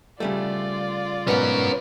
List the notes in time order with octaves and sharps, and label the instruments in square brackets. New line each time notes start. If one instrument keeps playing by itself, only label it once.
[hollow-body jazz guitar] C#3 G3 A3 [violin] F4 D5
[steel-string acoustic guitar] D2 B4 [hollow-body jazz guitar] G#2 B2 [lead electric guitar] C#4 A#4